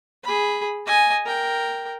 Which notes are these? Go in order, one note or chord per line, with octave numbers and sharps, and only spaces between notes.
G#4 B5
D#5 G#5
A#4 G5